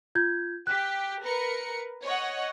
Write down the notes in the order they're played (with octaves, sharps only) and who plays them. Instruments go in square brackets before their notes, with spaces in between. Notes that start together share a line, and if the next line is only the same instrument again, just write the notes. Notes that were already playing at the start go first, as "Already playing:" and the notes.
[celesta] F4 G6 G#6
[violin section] G4 [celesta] F#6 B6
[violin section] A#4 B4 C#7
C#5 D#5 F#5